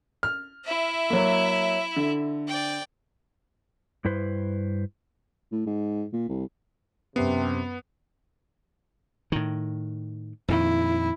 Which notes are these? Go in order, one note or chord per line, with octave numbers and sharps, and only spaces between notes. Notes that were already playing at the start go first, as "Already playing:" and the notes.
F6
E4 E5
F#3 A#3
D3
D5 G5
G2 E4 B4 C5
A2
G#2
A#2
C2
F#2 C3 B3 C7
A2 D#3
F2 A#2 D#3 E4